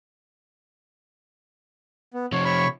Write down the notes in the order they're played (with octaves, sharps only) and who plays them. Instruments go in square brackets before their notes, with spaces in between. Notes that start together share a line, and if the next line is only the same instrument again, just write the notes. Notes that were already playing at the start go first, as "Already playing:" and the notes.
[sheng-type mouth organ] B3
[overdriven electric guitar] C3 F3 [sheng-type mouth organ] C#5
[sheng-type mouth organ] C#5 B5 C#6